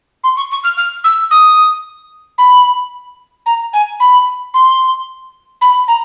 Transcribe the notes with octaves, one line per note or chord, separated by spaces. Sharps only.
C6
C#6
C#6
F6
F6
E6
D#6
B5
A#5
G#5
B5
C6
B5
A#5